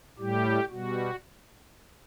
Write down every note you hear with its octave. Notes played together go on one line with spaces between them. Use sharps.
A2 G3 G4
B2 G3 F#4